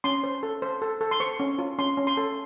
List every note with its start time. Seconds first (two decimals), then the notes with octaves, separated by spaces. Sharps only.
0.04 C#4 C6
0.24 C5
0.43 A4
0.62 C5
0.82 A4
1.01 A4
1.11 C6
1.20 C5 C#6
1.40 C#4
1.59 F4
1.79 C#4 C6
1.97 C#4
2.07 C6
2.17 A4